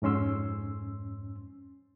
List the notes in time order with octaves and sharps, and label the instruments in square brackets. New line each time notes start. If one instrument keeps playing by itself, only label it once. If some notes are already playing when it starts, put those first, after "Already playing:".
[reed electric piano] F2 G#2 C#4 C6 E6